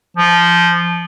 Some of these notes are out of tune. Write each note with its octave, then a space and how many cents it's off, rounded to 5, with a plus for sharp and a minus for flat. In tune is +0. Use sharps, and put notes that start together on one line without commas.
F3 -10